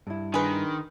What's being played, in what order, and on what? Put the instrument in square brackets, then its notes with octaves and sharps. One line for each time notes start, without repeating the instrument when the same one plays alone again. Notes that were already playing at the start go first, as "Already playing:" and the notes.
[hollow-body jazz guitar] G2 E4
[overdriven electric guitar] D#3 [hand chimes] D4 B5 C6 [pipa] G#4 B4